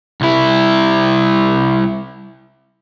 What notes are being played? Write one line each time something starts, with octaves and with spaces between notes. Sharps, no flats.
C2 E4